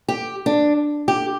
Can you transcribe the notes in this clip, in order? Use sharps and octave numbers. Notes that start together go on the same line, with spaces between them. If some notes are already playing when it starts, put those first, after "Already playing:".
G4
D4
G4